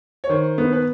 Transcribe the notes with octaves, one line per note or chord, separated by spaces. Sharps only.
C#5
D#3 C5
B3
B4